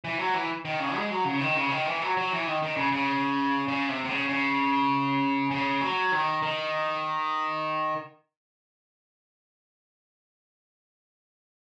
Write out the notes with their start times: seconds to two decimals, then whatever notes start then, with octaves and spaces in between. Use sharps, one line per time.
0.04 E3
0.19 F#3
0.34 E3
0.65 D#3
0.80 C#3
0.95 G#3
1.11 F#3
1.25 C#3
1.40 D#3
1.56 C#3
1.71 D#3
1.87 E3
2.02 F#3
2.17 F#3
2.32 E3
2.47 D#3
2.63 D#3
2.77 C#3
2.92 C#3
3.68 C#3
3.89 C3
4.05 C3
4.09 C#3
4.29 C#3
5.51 C#3
5.81 F#3
6.12 D#3
6.43 D#3